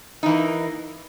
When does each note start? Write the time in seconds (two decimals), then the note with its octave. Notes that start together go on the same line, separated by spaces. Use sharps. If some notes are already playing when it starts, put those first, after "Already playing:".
0.23 D#4
0.26 E3
0.29 A#3